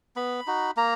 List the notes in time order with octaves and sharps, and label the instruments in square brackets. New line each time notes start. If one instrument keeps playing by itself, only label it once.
[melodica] B3 B5
D#4 F#4
A#3 A#5